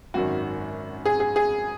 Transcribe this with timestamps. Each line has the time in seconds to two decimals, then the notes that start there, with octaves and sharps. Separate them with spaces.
0.14 G#1 F#2 D#3 F#4
1.05 G#4
1.20 G#4
1.36 G#4